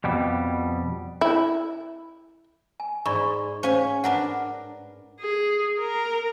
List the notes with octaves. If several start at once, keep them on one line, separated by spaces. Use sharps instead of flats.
F2 B2 G3
E4
G#5
G#2 D5 B5 C#6
C#4 C5 F5 G#5
D4 A#4 B4 F#5
G#4
A#4